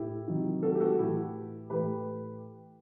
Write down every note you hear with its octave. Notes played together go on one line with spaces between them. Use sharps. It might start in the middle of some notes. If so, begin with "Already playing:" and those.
Already playing: A2 E4 G4
C3 D#3 F#3
F#4 A4
G4
F#4 A4
A2 E3 E4 G4
A2 E3 G4 B4